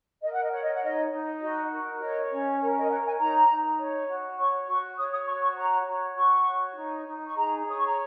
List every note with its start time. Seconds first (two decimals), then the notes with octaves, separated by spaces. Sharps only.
0.22 A#4 D#5
0.33 F#5
0.43 D#5
0.52 C#5 F#5
0.63 D#5
0.74 F#5
0.83 D#4 D#5
1.12 D#4
1.41 F#4 D#5
1.72 A#4
2.01 C#5 D#5
2.31 C#4
2.60 A#4 C#5
2.79 D#5
2.90 C#5 F#5
3.05 G#5
3.19 D#4 A#5
3.49 D#4
3.79 C#5
4.08 F#4
4.39 C#5 C#6
4.68 F#4 C#6
4.98 C#5 D#6
5.13 D#6
5.28 F#4 C#6
5.43 C#6
5.57 C#5 A#5
5.87 F#4
6.17 F#4 C#6
6.47 C#5
6.77 D#4
7.06 D#4
7.27 C#6
7.35 G#4 A#5
7.65 C#5 D#6
7.78 C#6
7.87 A#5